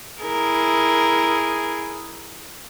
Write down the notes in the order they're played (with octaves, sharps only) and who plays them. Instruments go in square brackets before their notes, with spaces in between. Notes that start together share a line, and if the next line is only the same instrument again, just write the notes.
[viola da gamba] E4 A#4 [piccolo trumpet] G#4